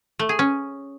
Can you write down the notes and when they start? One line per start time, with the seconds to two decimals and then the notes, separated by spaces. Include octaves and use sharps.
0.19 A3
0.29 G#4
0.39 C#4